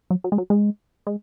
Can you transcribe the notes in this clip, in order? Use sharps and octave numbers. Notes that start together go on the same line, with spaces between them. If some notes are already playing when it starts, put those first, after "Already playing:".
F#3
F#3
G#3
F#3
G#3
G#3